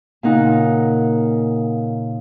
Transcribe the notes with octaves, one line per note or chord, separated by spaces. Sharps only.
A#2 C#3 D#4 F#5